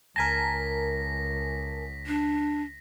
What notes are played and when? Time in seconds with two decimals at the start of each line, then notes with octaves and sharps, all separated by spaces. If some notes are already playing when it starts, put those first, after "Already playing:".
0.16 C#2 A#4 G#5 A5 A#6 B6
2.07 D4